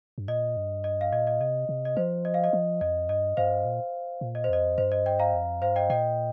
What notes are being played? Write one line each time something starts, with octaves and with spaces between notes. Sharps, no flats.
G2
A#2 D#5
G2
D#5
F5
A#2 D#5
D#5
C3 D#5
C3
D#5
F3 C5
D#5
F5
D#5
F3
F2 D#5
G2 D#5
G2 C5 F5
A#2
A#2
D#5
C5
F2 D#5
G2 C5
D#5
D#5 G5
F5 A#5
F2
G2 C5 F5
D#5 G5
A#2 D#5 G5